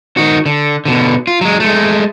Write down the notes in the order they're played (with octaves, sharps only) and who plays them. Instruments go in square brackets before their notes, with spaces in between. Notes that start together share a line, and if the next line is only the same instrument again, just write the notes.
[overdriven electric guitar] D#3 F#4
D3
B2 D3
F4
F#3 G#3
G#3 A3